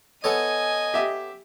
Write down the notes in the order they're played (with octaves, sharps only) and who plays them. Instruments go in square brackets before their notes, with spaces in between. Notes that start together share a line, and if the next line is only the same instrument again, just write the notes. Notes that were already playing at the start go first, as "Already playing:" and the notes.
[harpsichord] B3 A4 C#5 [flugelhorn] D#5 [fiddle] G#5
[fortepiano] G4 E5